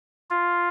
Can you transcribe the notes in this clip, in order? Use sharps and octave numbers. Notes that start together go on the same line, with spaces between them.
F4